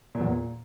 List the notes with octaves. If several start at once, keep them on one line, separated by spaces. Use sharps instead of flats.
A#2
E2
A#2